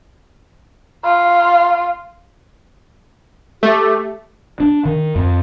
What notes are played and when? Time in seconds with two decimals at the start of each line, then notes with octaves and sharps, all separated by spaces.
1.04 F4
3.63 A3 G4
4.60 D4
4.85 D#3
5.16 F2